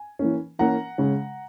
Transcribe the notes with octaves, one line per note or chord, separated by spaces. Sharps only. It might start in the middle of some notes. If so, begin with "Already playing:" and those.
Already playing: G#5
E3 A#3 C#4
E3 A#3 C#4 F#5 A#5
C#3 G#3 C#4